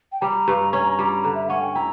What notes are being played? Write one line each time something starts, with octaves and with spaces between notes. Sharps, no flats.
G5
G3 A#5
G2
C#4
G3
D3
E5
C#4 F#5
G5
E4 A#5